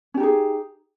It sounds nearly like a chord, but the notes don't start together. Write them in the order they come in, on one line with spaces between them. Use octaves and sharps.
C#4 G4 D#4 G#4